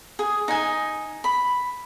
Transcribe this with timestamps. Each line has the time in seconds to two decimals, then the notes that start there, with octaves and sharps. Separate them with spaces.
0.19 G#4
0.48 D#4 G#5
1.24 B5